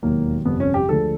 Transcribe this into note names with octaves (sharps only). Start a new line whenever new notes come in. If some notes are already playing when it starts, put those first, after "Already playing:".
E1 D#2 D#3 F#3 A#3
G1 F2 C3 B3
C#4
G4
D2 D3 F3 G#3 A4